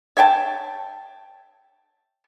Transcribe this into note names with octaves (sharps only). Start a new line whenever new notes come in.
C#5 E5 G5 A5